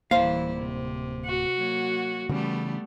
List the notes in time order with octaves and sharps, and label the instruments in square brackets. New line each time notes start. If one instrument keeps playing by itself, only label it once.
[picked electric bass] D1 A#3 [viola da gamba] E3 G3 E4 [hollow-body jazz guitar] C5 F5
[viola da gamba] C3
[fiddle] F#4
[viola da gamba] F#3 A#3
[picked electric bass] C#3 E3 C#4 [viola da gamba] G3 A3 B3